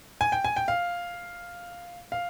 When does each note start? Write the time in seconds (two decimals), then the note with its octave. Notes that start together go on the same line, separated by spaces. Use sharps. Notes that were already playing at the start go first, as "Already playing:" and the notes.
0.21 G#5
0.32 G5
0.44 G#5
0.56 G5
0.68 F5
2.12 F5